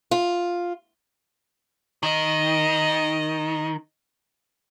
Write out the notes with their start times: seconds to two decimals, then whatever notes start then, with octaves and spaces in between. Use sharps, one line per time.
0.11 F4
2.03 D#3 D#5